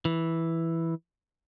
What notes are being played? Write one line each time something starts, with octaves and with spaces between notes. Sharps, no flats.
E3